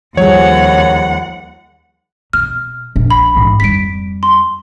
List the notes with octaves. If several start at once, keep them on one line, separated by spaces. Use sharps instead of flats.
D#2 F3 G3 G#4 C#5 F#5
B2 F6
A#1 A#2
B5
G#2 E3
F2 G3 B6 D7
C6